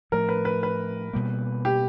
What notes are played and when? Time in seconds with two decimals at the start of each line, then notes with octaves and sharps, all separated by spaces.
0.12 A2 F3 A3 A#4
0.29 B4
0.45 B4
0.63 B4
1.13 B2 G3 A#3
1.65 G4